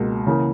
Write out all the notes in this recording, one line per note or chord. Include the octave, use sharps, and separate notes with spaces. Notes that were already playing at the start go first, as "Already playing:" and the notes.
Already playing: C#2 B2 A#3
C#3 E3 A#3